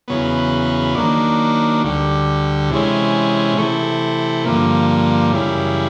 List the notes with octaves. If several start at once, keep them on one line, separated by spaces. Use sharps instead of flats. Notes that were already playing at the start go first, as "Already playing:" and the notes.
E2 C#3 F#3 B3
D#3 F#3 A#3 D4
D2 D3 G3
C3 E3 G#3 C#4
C3 E3 A3
G2 D3 F3 A#3
F#2 C#3 E3 G3